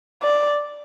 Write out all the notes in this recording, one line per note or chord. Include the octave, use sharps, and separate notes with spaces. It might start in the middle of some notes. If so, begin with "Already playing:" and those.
D5